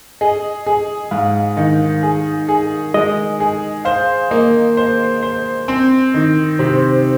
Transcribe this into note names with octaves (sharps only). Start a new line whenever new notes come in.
G#4 D#5
G#4
G#2 F5
D#3
G#4
G#4
G#3 D#5
G#4
C5 F5
A#3 D#5
C5
C5
C4
D#3
C3 C5